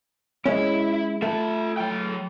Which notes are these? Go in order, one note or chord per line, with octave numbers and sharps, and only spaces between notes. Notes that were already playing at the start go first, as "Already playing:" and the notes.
G#3 C#4 E4 E5
A3 F4 E5
F#3 G5